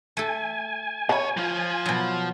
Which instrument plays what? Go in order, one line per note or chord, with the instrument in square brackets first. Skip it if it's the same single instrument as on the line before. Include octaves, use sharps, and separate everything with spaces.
[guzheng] A3 A4 [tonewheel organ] G#5
[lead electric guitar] B2 C#5 [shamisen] A5 B5
[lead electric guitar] F3 F4
[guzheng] B2 F#3